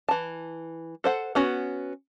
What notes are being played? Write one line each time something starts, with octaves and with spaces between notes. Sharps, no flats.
E3 A5
A4 C5 F#5
B3 C#4 F#4